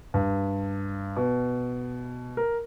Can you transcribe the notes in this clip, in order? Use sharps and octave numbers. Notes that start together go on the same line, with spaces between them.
G2
B2
A#4